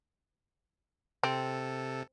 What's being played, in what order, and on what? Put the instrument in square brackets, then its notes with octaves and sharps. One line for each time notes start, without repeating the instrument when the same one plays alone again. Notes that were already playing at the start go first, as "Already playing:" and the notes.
[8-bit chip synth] C3 A4 [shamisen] C4